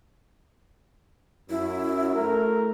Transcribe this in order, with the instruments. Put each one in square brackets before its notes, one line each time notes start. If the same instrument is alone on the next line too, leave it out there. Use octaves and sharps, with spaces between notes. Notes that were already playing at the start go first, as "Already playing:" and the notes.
[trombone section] F#2 [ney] E4
[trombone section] A3 A#4